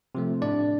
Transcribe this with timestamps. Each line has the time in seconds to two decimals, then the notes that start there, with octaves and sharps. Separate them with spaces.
0.15 C3 F3 A3
0.42 A2 D4 D5